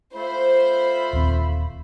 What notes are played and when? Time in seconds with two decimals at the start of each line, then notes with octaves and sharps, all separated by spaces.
0.15 A3 F4 C5 B5
1.13 D#1 D#2 C4